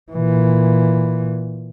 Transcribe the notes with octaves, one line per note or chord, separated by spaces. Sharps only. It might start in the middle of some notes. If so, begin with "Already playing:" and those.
A#2 E3